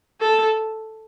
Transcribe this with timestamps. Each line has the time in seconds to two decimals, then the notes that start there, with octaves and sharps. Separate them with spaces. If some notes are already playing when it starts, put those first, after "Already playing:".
0.21 A4